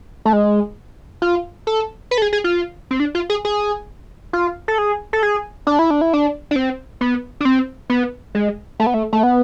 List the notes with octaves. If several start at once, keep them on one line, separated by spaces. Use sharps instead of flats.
A3
G#3
F4
A4
B4
A4
G#4
G#4
F4
C4
D4
F4
G#4
G#4
F4
A4
G#4
A4
G#4
D4
E4
D4
E4
D4
D4
C4
B3
D4
C4
B3
G#3
A3
B3
A3
A3
B3